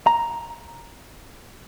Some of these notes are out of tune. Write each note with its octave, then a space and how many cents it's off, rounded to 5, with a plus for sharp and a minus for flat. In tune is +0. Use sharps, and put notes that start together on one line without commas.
A#5 +5